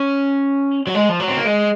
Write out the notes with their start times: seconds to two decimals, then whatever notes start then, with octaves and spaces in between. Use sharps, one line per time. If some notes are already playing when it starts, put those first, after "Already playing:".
Already playing: C#4
0.87 F#3
0.95 G#3
1.09 F3
1.20 F#3
1.28 C4
1.37 A#3
1.45 G#3